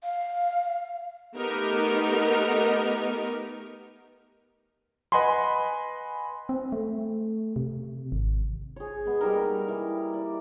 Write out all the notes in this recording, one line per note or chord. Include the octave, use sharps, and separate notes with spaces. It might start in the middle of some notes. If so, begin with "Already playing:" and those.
F5
A3 B3 D#4 G4 A#4
B4 D#5 F#5 G#5 B5 C6
C4
A3
C3
G#1
G#4 C#5
G#3 B3
G3 D#4 A#4
A#3
E3
D5